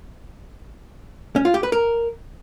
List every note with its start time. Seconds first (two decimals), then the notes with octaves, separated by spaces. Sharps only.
1.36 C#4
1.45 F4
1.54 G4
1.63 B4
1.72 A#4